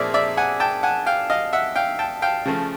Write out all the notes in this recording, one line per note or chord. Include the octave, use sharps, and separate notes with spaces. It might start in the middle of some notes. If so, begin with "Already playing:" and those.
Already playing: A#2 F3 A3 C4 G#4 A#4 D5 E5
D5 E5
F#5 G#5
G5 A5
F#5 G#5
F5 G5
D#5 F5
E5 F#5
F5 G5
G5 A5
F5 G5
C#3 F3 A3